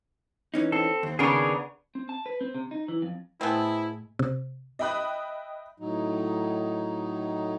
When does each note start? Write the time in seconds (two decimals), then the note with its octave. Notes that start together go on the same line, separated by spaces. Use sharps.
0.54 E3 C#4 D#4
0.72 C4 A4
1.03 D#2
1.19 C#3 B3 D4 G#4 A#4 C#5
1.95 C4
2.09 A5
2.26 B4
2.41 C4
2.55 C3
2.71 D#4
2.88 E3
3.02 F2
3.41 A2 A3 B3 C4 E4 G#4 D#5 A5
4.19 C3
4.79 D#5 E5 G5 B5 D#6 F#6
5.80 A2 F#3 D#4